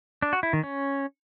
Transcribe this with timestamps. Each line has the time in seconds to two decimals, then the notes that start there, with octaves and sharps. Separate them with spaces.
0.22 D4
0.33 F#4
0.43 E4
0.53 D#3
0.63 C#4